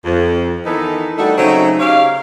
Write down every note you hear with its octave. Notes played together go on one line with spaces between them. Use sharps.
F2
D#3 E3 B3 D#4 A4 A#4
G3 A3 D4 D#4 F#4 A4
C#3 F#3 A3 C4 D#4
C#3 G4 C#5 F5